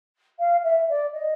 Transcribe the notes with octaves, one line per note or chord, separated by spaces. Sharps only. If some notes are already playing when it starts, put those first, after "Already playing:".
F5
E5
D5
D#5